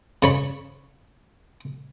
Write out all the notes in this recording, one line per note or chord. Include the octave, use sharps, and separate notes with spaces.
C#3 C#5 B5